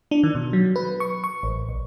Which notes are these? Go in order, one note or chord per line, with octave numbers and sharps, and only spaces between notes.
D4
D#3
B2
F#3
B4
C#6
C#6
A1
A#1